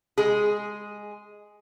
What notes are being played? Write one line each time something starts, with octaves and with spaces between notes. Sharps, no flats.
G#3 G#4